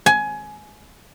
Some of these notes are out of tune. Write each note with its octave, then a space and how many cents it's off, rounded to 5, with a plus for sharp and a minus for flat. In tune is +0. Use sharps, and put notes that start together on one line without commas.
G#5 +20